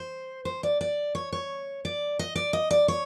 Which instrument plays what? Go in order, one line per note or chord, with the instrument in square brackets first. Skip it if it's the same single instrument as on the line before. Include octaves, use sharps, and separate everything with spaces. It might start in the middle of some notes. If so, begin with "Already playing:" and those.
Already playing: [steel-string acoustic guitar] C5
C5
D5
D5
C#5
C#5
D5
D#5
D5
D#5
D5
C#5